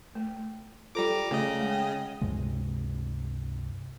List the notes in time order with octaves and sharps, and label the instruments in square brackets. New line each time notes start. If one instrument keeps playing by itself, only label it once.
[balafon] A3
[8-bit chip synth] G3 A#5 D6 [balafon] F4 A4 C5
[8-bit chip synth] C#3 D#5 [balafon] A3
[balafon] G#3 G5
[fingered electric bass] C#2 G2 C3 G#3